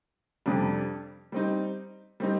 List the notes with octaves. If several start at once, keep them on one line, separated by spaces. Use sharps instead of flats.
F2 C3 G3 D4
G3 C4 D#4
G3 C4 D#4